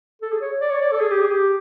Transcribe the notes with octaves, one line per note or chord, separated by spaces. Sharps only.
A4
G#4
C#5
D5
C#5
D5
A4
G#4
G4
G#4
G4